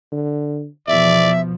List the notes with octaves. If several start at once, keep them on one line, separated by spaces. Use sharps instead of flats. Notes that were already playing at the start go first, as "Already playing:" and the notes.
D3
E2 B2 F3 D5 E5